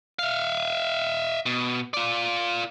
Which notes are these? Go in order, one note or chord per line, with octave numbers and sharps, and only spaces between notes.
E5 F5
B2
F4 D5